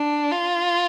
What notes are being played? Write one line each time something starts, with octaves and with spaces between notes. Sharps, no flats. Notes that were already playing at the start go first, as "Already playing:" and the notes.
Already playing: D4
F4